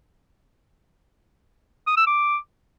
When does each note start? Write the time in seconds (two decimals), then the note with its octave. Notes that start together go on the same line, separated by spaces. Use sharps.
1.87 D#6
1.97 E6
2.07 D6